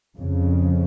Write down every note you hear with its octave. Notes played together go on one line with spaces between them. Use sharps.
F2 C#3